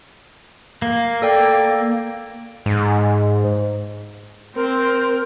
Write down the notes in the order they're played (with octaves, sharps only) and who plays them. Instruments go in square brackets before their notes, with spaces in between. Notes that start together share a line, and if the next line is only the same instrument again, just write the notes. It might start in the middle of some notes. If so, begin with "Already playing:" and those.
[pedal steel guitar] A#3
[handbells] A4 D5 G5
[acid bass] G#2
[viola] C4 [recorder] A#4